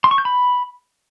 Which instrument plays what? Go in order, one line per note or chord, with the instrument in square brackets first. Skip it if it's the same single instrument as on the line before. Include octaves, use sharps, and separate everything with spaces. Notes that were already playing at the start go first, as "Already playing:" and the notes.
[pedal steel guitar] C6
C#6
G6
B5